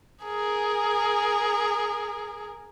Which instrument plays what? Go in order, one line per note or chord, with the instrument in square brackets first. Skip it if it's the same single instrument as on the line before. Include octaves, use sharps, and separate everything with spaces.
[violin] G#4 A#4